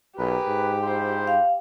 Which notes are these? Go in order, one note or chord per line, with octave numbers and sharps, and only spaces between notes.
B1 G4 G#4 A#4 B4
G#2
E4 F4 C5
F5